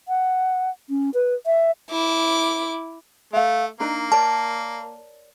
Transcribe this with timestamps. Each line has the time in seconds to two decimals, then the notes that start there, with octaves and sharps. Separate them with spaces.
0.08 F#5
0.89 C#4
1.14 B4
1.46 E5
1.90 E4 D6
3.33 A3 E5 F5
3.80 A#3 D4 D#4 A#4
4.12 A#4 C#5 D5 A5